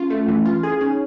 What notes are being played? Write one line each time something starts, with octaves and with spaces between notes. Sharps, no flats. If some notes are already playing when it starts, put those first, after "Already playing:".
Already playing: C#4 F4
A3
E3
F4
G#4
C#4 D#4